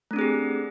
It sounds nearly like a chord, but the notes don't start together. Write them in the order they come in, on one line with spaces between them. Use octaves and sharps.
A3 D4 C4 G#4 G4